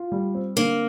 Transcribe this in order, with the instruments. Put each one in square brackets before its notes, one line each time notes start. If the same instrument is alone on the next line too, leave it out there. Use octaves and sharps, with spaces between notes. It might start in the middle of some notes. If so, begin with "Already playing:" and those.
Already playing: [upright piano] F4
G3
C4
[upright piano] D3 [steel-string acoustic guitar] A#3